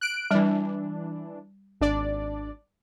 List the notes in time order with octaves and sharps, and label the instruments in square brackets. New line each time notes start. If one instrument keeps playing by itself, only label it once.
[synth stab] F#6 D7
[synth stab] E3 D4 [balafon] G3
[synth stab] G#1 D4 D5